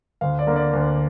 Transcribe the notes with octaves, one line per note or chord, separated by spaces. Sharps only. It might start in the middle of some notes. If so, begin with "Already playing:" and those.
D2 F5
D5
D3 A#3
D5
D2